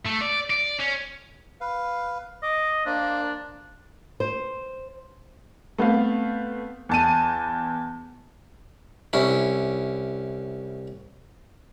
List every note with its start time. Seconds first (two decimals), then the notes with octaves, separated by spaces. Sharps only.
0.06 A3
0.21 D5
0.50 D5
0.80 C#4
1.61 B4 F5
2.43 D#5 D6
2.86 A#3 D4 C5
4.20 C5
5.78 A3 B3 C4 F5
6.89 E2 A5 D#7
9.13 C2 C#4 E4